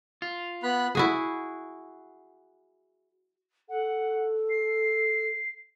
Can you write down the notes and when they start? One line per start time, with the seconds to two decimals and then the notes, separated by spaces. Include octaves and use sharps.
0.22 F4
0.63 B3 B5 F#6
0.95 E4 F#4 G#4
3.69 A4 F#5
4.50 C7